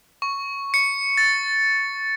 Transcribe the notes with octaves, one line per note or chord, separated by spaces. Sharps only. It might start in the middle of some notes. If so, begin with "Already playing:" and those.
C#6
C#7
A6